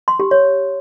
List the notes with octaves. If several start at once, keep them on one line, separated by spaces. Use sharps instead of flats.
C6
G4
C#5